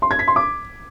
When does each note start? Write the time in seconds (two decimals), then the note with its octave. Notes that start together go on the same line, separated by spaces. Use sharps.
0.02 C6
0.11 G#6
0.19 B6
0.28 C6
0.36 D6